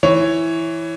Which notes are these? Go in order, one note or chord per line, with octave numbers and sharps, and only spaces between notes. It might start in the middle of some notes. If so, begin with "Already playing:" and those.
E3 C#5